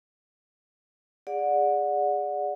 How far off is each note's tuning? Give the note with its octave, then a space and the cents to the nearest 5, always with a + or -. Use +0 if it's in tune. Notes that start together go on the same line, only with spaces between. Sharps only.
G#4 -20 D5 +0 F#5 -25